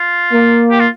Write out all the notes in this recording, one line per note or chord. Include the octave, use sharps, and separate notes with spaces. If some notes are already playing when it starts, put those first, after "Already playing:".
Already playing: F4
A#3
G4
F4